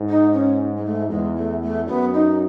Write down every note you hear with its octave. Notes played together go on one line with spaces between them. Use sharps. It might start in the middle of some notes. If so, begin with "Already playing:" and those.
Already playing: G#2
D#4
C#4
G#3
A3
E2 G#3
A3
A3
F#2 B3
D#4